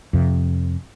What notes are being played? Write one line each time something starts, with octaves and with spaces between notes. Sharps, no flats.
F2 C3